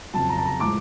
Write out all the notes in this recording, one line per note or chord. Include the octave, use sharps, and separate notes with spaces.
F2 C#3 F#3 A5
A#5
A5
A#5
A2 F3 G#3 D6